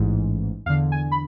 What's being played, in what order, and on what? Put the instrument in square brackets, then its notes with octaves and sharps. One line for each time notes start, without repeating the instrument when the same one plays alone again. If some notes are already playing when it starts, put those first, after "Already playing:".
Already playing: [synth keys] A1 G#2 E3
E2 F5
D3
G#5
B5